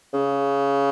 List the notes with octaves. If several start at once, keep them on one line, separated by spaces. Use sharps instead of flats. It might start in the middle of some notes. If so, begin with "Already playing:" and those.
C#3